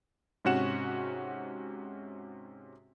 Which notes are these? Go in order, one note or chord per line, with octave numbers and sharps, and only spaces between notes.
G#2 C3 C#4 F#4 F#5 E7